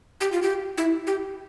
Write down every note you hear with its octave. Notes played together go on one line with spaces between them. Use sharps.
G4
F4
G4
E4
G4